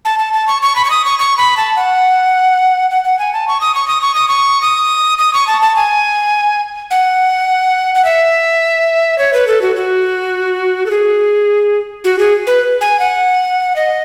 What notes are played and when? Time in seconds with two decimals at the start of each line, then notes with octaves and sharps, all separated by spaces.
0.05 A5
0.19 A5
0.33 A5
0.47 C#6
0.62 C#6
0.76 B5
0.85 C#6
0.90 D#6
1.05 C#6
1.19 C#6
1.37 B5
1.57 A5
1.76 F#5
2.91 F#5
3.04 F#5
3.19 G#5
3.33 A5
3.48 C#6
3.61 D#6
3.75 C#6
3.88 D#6
4.02 C#6
4.15 D#6
4.28 C#6
4.62 D#6
5.18 D#6
5.33 C#6
5.47 A5
5.62 A5
5.76 G#5
6.91 F#5
7.95 F#5
8.05 E5
9.18 C#5
9.33 B4
9.47 A4
9.62 F#4
9.76 F#4
10.86 A4
10.91 G#4
12.04 F#4
12.19 G#4
12.47 B4
12.81 G#5
12.99 F#5
13.76 D#5